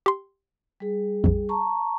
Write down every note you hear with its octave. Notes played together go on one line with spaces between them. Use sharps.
G4 C6
G3 G#4
A#1 F2
A5 A#5 C#6